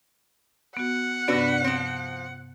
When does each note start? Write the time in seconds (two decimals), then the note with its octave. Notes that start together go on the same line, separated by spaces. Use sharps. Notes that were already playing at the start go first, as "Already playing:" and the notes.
0.77 B3 F#4 F#5
1.28 G2 C3 B3 D4 F#4 B4
1.64 F3 C4